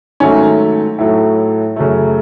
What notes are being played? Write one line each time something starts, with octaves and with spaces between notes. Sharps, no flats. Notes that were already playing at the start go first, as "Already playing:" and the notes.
G#2 D#3 F#3 A3 C#4
A2 F#3 A3
F#2 C#3 F#3 A3